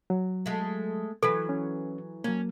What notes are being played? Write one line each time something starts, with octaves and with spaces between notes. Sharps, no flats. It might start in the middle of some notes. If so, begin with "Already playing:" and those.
F#3
G#3 A3
E3 F#3 A4 B4
C#4
F#3 A#3 C#4